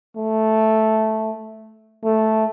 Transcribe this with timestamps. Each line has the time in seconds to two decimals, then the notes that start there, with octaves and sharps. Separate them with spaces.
0.17 A3
2.04 A3